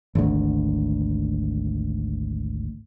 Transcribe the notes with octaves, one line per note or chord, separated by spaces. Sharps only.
G#1 D2